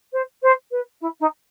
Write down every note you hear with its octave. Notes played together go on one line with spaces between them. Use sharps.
C5
C5
B4
E4
D#4